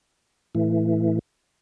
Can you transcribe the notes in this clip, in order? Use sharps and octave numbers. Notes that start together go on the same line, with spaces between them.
A2 E3